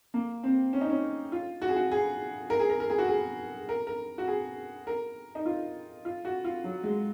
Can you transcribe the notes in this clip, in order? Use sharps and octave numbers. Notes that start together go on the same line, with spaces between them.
A#3
C4
C#4
D#4
C#4
F4
F#4
G#4
F#4
G#4
A#4
G#4
A#4
A#4
G#4
F#4
G#4
A#4
A#4
F#4
G#4
A#4
D#4
F4
F4
F#4
F4
F#3
G#3